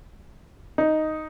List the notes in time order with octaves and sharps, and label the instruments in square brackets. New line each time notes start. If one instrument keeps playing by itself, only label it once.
[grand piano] D#4